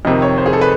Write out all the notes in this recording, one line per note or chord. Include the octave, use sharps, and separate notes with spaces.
F2 C3 D#3 D#5
C#5
C5
G#4
A4
B4